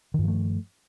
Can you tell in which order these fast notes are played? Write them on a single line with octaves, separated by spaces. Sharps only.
D#3 G2 F3 A3